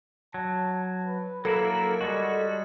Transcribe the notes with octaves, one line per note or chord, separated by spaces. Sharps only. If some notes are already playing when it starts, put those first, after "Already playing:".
F#3 A5
B4
F#3 A#3 E4 A4 A#4
G3 G#3 F#4 D#5